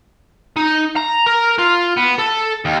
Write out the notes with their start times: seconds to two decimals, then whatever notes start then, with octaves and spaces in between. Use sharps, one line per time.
0.57 D#4
0.96 A#5
1.26 A#4
1.59 F4
1.97 B3
2.18 A4
2.65 D#2